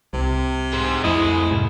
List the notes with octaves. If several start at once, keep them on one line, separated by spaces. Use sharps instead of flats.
C2 C3
G#4 C5
F2 A3 E4 D#5
C2 G#2